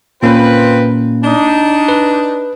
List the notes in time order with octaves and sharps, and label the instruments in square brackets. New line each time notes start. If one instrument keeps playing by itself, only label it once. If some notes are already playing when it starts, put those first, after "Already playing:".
[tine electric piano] A#2 A#3 C#4 [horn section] C4 F4 B4
[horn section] D4 D#4
[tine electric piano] B4